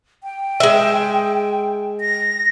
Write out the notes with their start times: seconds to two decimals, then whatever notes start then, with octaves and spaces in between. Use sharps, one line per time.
0.24 G5
0.60 G#3 E5
2.01 A#6